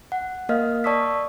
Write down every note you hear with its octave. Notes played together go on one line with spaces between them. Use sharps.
F#5
A#3 A#4 D#5 F5 F6
D5 A5 C#6 D#6 E6 B6